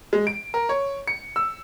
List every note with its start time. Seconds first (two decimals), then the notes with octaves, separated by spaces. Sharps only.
0.13 G#3
0.27 D7
0.54 A#4
0.69 C#5
1.08 C#7
1.36 E6